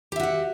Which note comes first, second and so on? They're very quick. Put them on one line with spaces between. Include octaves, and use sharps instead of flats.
G4 E5 F#4 F#5